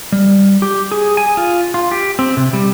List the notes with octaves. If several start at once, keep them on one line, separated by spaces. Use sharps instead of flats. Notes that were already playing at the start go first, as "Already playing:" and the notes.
G3
G4
G#4
G#5
F4
F4
G4
C4
C3
G3